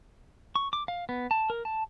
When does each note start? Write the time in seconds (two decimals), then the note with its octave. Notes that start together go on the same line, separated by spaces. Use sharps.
0.56 C#6
0.73 D6
0.88 F5
1.09 B3
1.31 A5
1.50 A#4
1.65 A5